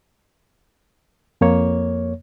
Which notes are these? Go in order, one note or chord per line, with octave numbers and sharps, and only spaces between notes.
F2 A#3 C#5